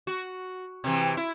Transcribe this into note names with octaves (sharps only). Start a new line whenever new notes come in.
F#4
C3 E3
E4